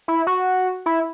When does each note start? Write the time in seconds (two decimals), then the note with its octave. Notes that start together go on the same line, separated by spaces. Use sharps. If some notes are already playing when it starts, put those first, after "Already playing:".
0.08 E4
0.27 F#4
0.86 E4